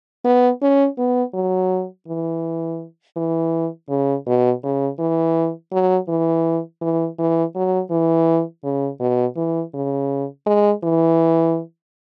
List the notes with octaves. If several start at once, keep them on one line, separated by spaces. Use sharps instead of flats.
B3
C#4
B3
F#3
E3
E3
C#3
B2
C#3
E3
F#3
E3
E3
E3
F#3
E3
C#3
B2
E3
C#3
G#3
E3